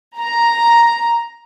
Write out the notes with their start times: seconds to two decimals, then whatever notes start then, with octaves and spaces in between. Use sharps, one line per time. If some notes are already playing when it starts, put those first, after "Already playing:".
0.17 A#5